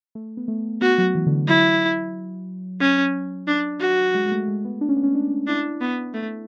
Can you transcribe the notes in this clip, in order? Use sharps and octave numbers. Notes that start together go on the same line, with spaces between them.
A3
B3
A3
B3 F#4
F#3
E3
D3
E3
F#3 E4
C#4
D4
F#4
G#3
G#3
A3
G#3
B3
D4
C#4
B3
C#4
D4
D4 E4
B3
A3